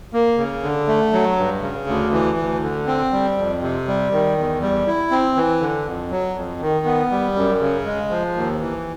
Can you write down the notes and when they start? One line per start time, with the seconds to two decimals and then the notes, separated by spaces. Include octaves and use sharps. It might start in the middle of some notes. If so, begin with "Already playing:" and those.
0.13 A#3
0.37 C#3
0.63 D3
0.88 A3
1.13 F#3
1.37 G2
1.62 C#3
1.87 D2
2.12 E3
2.38 D2
2.63 D3
2.87 C4
3.12 G3
3.37 F2
3.62 C3
3.87 G3
4.12 D#3
4.37 E2
4.62 G3
4.87 E4
5.11 C4
5.36 E3
5.61 D3
5.85 F2
6.11 F#3
6.36 F2
6.61 D#3
6.85 B3
7.11 G3
7.36 F#2
7.61 C#3
7.85 G#3
8.10 F3
8.35 D#2
8.60 E3